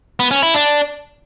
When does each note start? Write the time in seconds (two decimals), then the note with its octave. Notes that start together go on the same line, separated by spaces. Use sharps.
0.20 B3
0.31 C#4
0.43 E4
0.54 D4